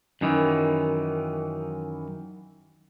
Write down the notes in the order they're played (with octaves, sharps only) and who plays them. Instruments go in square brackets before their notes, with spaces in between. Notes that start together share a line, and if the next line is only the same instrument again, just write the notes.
[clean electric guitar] F#2 D#3 E3